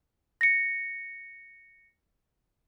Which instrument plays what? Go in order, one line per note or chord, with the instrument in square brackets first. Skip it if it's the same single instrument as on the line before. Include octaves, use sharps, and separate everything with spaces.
[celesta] A#6 C#7